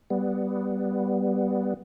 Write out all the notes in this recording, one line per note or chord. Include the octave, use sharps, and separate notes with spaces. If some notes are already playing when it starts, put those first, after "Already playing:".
G3 B3